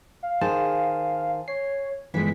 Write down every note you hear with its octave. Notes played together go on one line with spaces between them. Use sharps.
F5
D#3 G#4 C5 A5
C#5 C7
G1 E3 G#3 B6